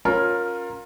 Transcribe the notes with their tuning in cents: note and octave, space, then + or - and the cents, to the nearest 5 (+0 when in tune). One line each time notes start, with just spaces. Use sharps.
C#4 -5 F4 +25 A#4 +0